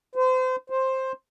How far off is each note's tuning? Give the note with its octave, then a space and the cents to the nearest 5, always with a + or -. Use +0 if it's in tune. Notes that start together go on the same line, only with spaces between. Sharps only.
C5 -30
C5 +10